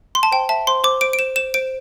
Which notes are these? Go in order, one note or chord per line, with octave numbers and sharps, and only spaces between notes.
C6
A5
C5 G5
E5 A5
C5 C6
C5 D6
C5 D7
D7
C5 E7
C5 E7
C5 D7